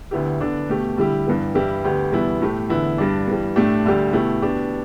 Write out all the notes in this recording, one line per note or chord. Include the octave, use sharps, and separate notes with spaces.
D2 D3 B3 E4 G4
D3 B3 D4
B2 A3 G4
D3 G3 E4 G4
G2 E3 G3 B3
G2 E3 G3 E4 G4
D2 D3 B3 G4
E2 B2 G3 B3 E4
A2 A3 G4
E2 D3 B3 E4
G2 G3 D4
G2 E3 G3
A2 A3 D4 G4
D2 D3 G3 D4 G4
B2 A3 E4 G4
B2 B3 D4 G4